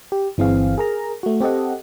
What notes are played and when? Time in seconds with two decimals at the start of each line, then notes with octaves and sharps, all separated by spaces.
0.12 G4
0.38 G1 E3 C4 G#4 F5
0.78 G#4 A#4 A#5
1.23 A3 F#4
1.41 C4 G4 A4 D#5 F#5